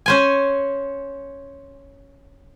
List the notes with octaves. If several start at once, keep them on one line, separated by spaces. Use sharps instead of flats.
C#4 C5 G#5